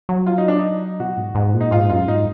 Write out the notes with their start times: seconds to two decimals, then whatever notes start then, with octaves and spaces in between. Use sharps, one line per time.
0.09 F#3
0.26 F4
0.38 D#4
0.48 D4
0.59 D#4
1.00 B2 F#4
1.17 G#2
1.35 G#2
1.54 A#2
1.61 D#4
1.71 G#2 F4
1.90 F#2 F4
2.07 G#2 D#4